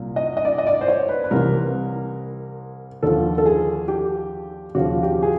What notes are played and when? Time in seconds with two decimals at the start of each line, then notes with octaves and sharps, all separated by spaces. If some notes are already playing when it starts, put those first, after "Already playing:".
Already playing: C2 A#2
0.16 D#5
0.37 D#5
0.45 D5
0.58 D#5
0.67 D5
0.81 C5
0.88 C#5
1.09 B4
1.24 B4
1.31 C2 C3 E3 A#4
3.03 D#2 D3 F3 A4
3.38 A4
3.46 G#4
3.88 G4
4.75 D#2 C#3 F3 F#4
5.03 G4
5.23 G#4